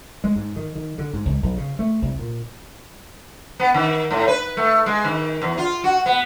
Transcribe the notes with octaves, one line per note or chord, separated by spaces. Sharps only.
G#3
G#2
D#3
D#3
D3
G#2
C#2
B1
C#3
A3
C2
A#2
B3
D#3
A2
B4
A3
G#3
D#3
E2
F4
F#4
B3